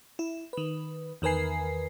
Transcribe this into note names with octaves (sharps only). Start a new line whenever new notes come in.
E4
D#3 B4
E2 D#3 A#4 B4 G#5 C7